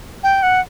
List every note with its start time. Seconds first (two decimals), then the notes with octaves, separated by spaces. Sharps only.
0.23 G5
0.43 F#5